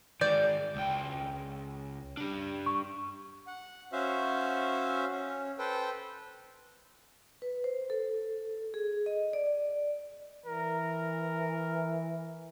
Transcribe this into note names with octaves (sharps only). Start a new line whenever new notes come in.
D#3 G#3 D5 G6
C#2 G5
D4 G4
C#6
F#5
C#4 F#4 C5 E5 F5
C#4
A4 B4 C5 G5
B4
C5
A4
G#4
D#5
D5
E3 A#4